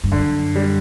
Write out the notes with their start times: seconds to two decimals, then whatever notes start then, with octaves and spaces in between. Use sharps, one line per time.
0.04 G2
0.12 F#2 D3
0.56 G3